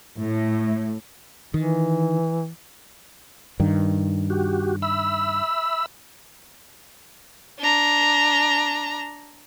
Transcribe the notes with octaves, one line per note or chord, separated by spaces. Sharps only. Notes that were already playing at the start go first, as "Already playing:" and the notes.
A2
D#3 E3
G2 D#3
F#4 G4
E5 B5 E6
D4 A#5